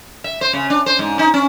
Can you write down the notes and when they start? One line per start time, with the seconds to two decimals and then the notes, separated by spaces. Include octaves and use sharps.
0.24 E5
0.41 C5
0.53 C#3
0.70 D4
0.86 C5
0.99 G#2
1.19 D#4
1.34 C#4